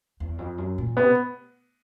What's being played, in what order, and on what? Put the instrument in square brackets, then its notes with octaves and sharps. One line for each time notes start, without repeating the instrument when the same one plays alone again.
[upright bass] E2
F2
F#2
A#2
[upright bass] C3 [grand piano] B3